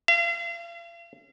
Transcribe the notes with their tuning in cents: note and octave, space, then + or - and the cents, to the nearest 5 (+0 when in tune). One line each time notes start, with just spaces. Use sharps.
F5 -40